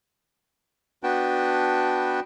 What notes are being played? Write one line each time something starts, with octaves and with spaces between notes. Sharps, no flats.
B3 D4 F#4 B4 G5 A5